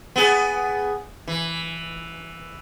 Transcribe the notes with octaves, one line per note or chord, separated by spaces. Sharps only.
B3 G#4
E3